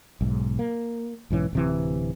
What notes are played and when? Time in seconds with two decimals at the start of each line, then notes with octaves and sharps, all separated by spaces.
0.21 B1 G#2
0.59 A#3
1.30 B1 G#2 E3 C#4
1.53 D1 C3 E3